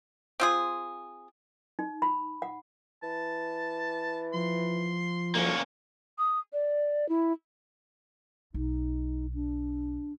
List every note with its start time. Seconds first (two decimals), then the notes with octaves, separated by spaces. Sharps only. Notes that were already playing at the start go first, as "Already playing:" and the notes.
0.40 C4 F4 G#4
1.79 D#4
2.02 B5
2.42 F#5
3.03 E3 A5
4.33 F3 C6
5.35 D2 A#3 C#4
6.18 D#6
6.53 D5
7.09 E4
8.54 B1 D#4
9.34 D4